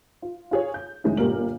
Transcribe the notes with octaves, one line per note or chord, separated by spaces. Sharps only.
F4
F4 G#4 C#5
G6
F1 D#3 G#3 C#4 E4
G1 A#2 G3 A#3 A#4 F#7